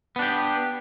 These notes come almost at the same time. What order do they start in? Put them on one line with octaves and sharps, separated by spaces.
B3 D4 G4